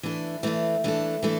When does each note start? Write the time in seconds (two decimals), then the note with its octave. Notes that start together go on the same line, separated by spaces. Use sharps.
0.03 E3 A3 D4 A4
0.43 E3 A3 D4 A4
0.84 E3 A3 D4 A4
1.23 E3 A3 D4 A4